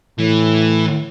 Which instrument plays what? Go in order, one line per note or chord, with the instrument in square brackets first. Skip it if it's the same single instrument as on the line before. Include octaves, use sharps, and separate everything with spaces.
[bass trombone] A2 [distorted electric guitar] E3